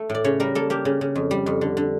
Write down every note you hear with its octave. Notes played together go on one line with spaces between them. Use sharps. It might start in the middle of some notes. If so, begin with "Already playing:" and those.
Already playing: A3
A2
D5
C#3 C#5
G3 A#4
A#3 A4
A#3 G4
C#3
C#3
F2
G3
F2
D3
D3